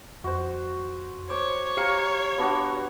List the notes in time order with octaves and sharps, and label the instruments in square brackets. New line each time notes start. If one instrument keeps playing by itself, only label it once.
[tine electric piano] F2 [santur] F#4 C5
[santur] C5 [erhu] C#5 [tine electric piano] D6
[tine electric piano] G4 C#7 [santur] F5 A#5
[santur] B3 D4 F#4